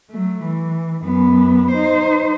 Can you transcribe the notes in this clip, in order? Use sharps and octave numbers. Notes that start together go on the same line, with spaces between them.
F#3 A3
E3
F#2 B3
D#4 C5